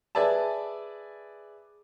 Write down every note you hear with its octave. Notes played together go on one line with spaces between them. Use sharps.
G#4 B4 D5 E5 A5